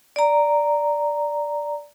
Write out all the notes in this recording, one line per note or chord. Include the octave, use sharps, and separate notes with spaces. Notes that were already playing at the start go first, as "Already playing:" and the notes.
D5 A#5